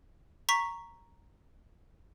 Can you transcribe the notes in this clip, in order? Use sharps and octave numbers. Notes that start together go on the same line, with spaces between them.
A#5 C#6 B6